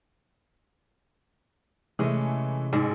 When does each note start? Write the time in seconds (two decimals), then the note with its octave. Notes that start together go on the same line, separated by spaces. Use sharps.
1.99 C3 E3 G#3 A3 C#4
2.73 A1 G#2